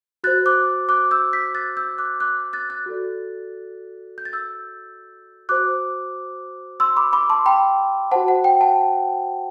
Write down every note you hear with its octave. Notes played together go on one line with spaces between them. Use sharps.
F#4 C5 F#6 A6
D6 F#6
D6 F#6
E6 G6
G6 B6
F#6 A6
E6 G6
D6 F#6
D6 F#6
F#6 A6
F#6 A6
F#4 A4 D5
G6
A6
E6 G6
F#4 C5 D6 F#6
C6 E6
B5 D6
B5 D6
A5 C6
G5 B5
F#4 C5 F#5 A5
F#5
G5
F#5 A5